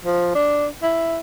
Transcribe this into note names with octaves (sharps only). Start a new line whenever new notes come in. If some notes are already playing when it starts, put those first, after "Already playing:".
F3
D4
E4